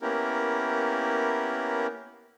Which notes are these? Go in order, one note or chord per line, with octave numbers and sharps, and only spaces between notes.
A#3 B3 C#4 E4 G4 A#4